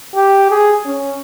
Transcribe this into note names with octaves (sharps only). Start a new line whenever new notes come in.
G4
G#4
C#4